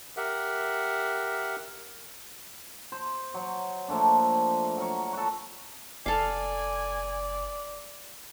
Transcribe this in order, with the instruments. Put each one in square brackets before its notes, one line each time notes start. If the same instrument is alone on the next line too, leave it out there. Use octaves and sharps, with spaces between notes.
[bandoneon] G4 A#4 E5 F#5
[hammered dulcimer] C5
F#3
F3 A3 A#3 D4
F#3 A#4 C#5
F#4 A4
[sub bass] F#1 [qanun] A4 F5 [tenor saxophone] D5 [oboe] G#5